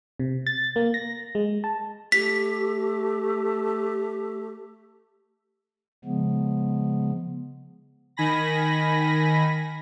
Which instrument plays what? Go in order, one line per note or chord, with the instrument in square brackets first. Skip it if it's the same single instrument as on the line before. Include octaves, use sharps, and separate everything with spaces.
[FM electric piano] C3
A6
A#3
A#6
G#3
A5
[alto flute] A3 [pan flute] G4 [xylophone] B6
[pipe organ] C#3 F3 G#3 B3
[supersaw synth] D#3 G#5 B5 A#6